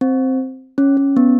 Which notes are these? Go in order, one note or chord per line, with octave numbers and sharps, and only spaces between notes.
C4
C#4
C#4
B3